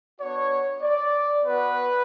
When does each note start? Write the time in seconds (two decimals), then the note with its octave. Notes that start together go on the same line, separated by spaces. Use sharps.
0.20 B3 D4 F#4 C#5
0.81 D5
1.43 B3 F#4 B4